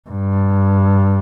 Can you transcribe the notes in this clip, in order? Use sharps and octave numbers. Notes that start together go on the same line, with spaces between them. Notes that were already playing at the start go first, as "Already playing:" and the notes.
G2